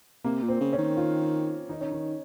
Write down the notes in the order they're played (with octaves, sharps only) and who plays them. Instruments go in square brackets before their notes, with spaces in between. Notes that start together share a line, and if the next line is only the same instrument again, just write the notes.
[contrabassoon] C3 [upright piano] A#3
[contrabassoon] A#2
[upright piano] C4
[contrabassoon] C#3
[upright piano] C#4
[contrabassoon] D#3
[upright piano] F4
[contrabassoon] D#3 [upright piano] D#4
[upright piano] C#4
[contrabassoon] D#3 [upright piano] D#4